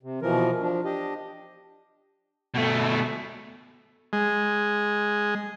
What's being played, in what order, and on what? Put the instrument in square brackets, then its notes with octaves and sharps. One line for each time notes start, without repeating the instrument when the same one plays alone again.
[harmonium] C3
B2 E3 F3 A#4
F3 D4
D4 G4 D#5
[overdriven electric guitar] B2 A3
[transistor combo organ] G#3